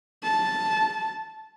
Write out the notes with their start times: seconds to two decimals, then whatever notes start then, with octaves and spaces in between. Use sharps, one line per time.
0.23 A5